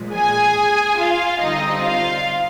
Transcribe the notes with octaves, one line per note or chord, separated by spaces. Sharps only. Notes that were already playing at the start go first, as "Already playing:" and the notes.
Already playing: A#2 F3 G#3
G#4 G#5
F4 F5
D3 G3 C4 D#4 D#5
F4 F5